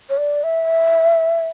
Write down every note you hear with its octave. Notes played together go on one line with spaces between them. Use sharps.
C#5
D5
E5